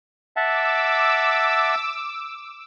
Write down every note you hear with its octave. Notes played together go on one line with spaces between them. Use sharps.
E5 F#5 A5 D6 E6